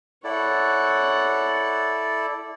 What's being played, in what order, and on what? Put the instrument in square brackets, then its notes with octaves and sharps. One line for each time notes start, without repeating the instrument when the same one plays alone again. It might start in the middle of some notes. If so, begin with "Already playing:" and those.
[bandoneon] E4 A4 D5 [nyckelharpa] C#5 F#5